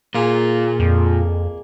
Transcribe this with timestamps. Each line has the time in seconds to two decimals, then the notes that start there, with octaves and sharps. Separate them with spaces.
0.14 A#2 A#3 F4 G#4
0.80 F2